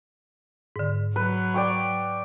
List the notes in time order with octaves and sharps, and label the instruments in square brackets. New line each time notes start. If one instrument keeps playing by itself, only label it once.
[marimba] G#2 D3
[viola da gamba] F#3 [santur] B4
[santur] D5 G5 C#6